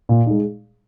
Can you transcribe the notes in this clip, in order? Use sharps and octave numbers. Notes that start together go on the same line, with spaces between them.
A#2
G#3 D#4